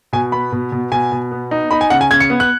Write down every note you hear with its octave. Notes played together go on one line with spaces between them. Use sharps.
B2 G#5
B3 B5
B2
B2
B2 G#5
B2
B3
D#4
D#4 B5
G#5
C#3 F#5
G#5
C#3 G#6
C#7
B3
F#6